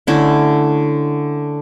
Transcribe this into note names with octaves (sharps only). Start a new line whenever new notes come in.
D3 A3 C#4 E4